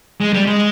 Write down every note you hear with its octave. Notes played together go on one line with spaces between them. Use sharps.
G#3
G3
G#3